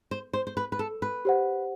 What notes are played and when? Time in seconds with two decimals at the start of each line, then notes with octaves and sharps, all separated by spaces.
0.11 C5
0.33 C5
0.47 C5
0.57 B4
0.72 B4
0.79 A4
1.02 B4
1.25 G4 C5 F#5